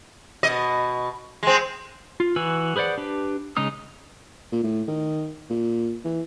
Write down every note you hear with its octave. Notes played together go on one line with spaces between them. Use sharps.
B2 D#5
G#3 C4
F4
E3 F#4 B4 G#5 E6
G#4 B4 C5 D5 F#5
D4 G4 B4
C#3 G#3 D#4 D#6
A#2
A2
D#3
A#2
E3